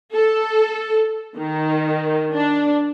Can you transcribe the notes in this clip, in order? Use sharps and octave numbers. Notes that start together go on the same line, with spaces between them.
A4
D#3
D4